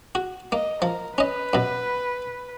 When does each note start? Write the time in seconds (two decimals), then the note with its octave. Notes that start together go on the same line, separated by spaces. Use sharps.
0.15 F#4
0.52 A#3 D#5
0.82 F3 A#4
1.18 C#4 B4 D#5
1.53 F#2 B2